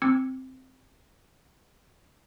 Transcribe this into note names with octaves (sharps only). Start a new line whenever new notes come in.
C4 D6 E6 G#6 C#7